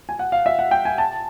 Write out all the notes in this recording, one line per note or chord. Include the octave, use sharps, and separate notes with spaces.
G#5
F#5
F5
E5
F#5
G5
G#5
A5